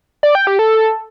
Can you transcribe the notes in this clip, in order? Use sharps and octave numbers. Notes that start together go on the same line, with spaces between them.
D5
G5
G4
A4